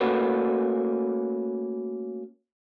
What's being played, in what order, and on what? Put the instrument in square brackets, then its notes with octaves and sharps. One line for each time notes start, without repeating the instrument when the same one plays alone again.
[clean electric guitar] A3 A#3 C#4 F#4 B4